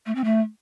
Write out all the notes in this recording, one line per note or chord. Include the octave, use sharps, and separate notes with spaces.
A3
C4
A3